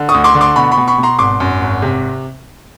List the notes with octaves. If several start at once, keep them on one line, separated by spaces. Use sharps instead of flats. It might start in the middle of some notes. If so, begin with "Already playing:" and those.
Already playing: D3
C#6 D#6
D2
C6 D6
D3
C6 D6
B2 B5 C#6
B5 C#6
B2
B5 C#6
B2
A#5 C6
G#1 C6 D6
F#2
G#1
C3